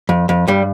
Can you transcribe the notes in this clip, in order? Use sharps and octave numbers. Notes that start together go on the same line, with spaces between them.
F2
F2
G2 G3